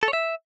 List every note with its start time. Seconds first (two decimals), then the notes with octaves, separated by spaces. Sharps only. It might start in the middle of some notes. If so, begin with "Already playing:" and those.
0.03 A4
0.08 C#5
0.13 E5